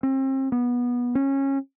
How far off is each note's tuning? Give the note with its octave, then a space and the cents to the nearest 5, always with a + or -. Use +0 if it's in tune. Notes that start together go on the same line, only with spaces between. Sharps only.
C4 +35
B3 -20
C#4 -20